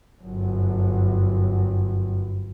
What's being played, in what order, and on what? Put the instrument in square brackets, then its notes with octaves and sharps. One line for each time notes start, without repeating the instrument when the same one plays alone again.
[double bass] G1 F#2